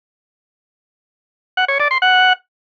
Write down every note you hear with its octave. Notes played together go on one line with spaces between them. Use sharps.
F#5
C#5
D5
C6
F#5